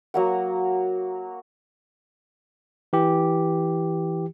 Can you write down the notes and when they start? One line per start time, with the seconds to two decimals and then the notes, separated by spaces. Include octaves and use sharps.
0.14 F#3 A#3 F#5
2.93 E3 G4